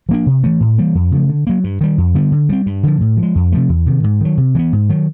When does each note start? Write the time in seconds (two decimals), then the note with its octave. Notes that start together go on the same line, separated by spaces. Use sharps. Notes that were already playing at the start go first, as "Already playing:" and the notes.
0.09 F3 A#3 D4
0.26 C3
0.44 E3 A3
0.60 A2
0.78 E3 G3 A#3
0.95 F2
1.12 C#3 F3 A3
1.29 D3
1.47 F#3 A#3
1.64 G2
1.81 D#3 G3
1.98 F2
2.15 D3 G3 B3
2.32 D3
2.49 G3 C4
2.66 G2
2.83 D3 F3
3.01 A2
3.17 F3
3.23 G#3
3.35 F2
3.52 C3 F3 A3
3.69 E2
3.86 C3 D#3
4.04 G#2
4.21 D#3 F#3
4.38 C3
4.55 E3 G#3
4.59 B3
4.73 G#2
4.89 D#3 F#3